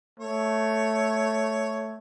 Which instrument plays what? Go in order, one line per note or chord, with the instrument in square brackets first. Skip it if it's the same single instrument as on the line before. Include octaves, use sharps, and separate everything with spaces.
[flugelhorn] A3 [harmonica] C#5